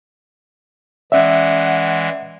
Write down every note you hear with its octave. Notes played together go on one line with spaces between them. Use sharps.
E3 G#3 C#4 D5 E5 F#5